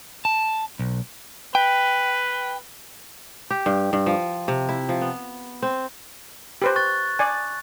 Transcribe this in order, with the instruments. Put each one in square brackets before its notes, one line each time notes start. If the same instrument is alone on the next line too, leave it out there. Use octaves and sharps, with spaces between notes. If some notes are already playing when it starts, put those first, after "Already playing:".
[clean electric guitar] A5
B1
[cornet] B4 [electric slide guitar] G5
[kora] G4
G2
G2
F3
C3
E4
F3
B3
C4
[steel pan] G4 B4 C5
[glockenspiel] C#6 F#6 A6
[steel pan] D5 G#5